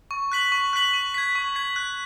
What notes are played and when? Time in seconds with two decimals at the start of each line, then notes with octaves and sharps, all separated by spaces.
0.11 C#6
0.32 F#6 B6 F#7
0.52 C#6
0.73 F#6 B6 F#7
0.93 C#6
1.14 G#6 B6
1.35 C#6
1.56 G#6 B6
1.76 F#6